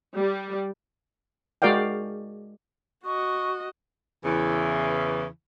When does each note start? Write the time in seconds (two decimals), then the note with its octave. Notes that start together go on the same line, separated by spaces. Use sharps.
0.17 G3
1.62 G#3 F#4 A#4 D5 F5 G5
3.05 F#4 D#5 C#6
4.25 E2 C#3 E3